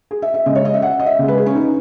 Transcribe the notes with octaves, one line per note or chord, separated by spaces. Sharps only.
G#4
E5
E5
C#3 G#3 D#5
C#5
D#5
E5
F#5
D#5
E5
C#3 G#3
B4
G#4
C#4
D#4